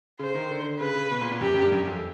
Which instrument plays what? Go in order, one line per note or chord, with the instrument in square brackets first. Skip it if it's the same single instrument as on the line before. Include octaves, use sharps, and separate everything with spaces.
[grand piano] C#3 [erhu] C5
[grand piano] D#3
D3
[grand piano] C#3 [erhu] B4
[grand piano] C#3
B2
A#2
A#2
[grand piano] F#2 [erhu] G4
[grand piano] F#2
G2
F#2
F2